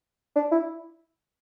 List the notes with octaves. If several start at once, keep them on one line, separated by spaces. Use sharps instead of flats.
D4
E4